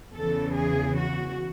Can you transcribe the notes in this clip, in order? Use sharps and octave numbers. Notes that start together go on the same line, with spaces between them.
E2 C#3 E3 A4
G#4
F#4